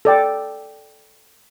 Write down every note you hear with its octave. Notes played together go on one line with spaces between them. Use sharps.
A4 D5 G5